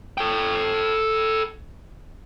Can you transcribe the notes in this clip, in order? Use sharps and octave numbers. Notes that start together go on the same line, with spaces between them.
A4 G5